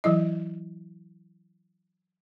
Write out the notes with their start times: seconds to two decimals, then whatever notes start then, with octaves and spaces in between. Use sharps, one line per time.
0.04 E3 F#3 E4 D#5